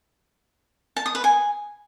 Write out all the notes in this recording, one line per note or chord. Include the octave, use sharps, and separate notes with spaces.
A5
D#6
B4
G#5